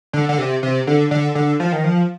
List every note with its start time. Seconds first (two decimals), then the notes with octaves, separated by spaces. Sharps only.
0.13 D3
0.29 D3
0.38 C3
0.63 C3
0.87 D3
1.11 D3
1.35 D3
1.60 F3
1.72 D#3
1.84 F3